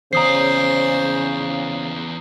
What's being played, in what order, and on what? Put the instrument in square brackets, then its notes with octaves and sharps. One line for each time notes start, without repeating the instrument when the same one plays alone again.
[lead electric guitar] E2 D5 [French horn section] C#3 [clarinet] C5 [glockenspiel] A#5 D#6 C7